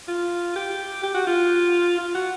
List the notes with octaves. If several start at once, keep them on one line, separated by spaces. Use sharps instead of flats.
F4
G4
G4
F#4
F4
F4
F#4